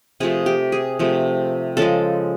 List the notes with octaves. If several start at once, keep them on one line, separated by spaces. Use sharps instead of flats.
C3 F3 A3 G#4
G4
G#4
C3 F3 A3
C#3 F3 G#3 A4